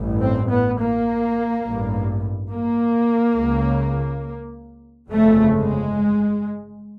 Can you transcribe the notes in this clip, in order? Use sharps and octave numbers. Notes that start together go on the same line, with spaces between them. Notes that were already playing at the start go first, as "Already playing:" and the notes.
Already playing: A1 G2
C4
B3
A#3
A1 G2
A#3
C#2 C#3
G1 F2 C#3 A3
G#3